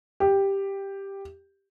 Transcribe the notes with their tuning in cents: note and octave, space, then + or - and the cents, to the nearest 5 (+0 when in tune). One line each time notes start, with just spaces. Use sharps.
G4 +5